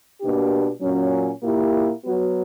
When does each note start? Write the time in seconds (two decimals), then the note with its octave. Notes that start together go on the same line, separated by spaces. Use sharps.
0.21 B2 A#3 D4 G4
0.81 A#2 F#3 C#4
1.42 A#2 A#3 E4 G4
2.03 F#3 B3 F#4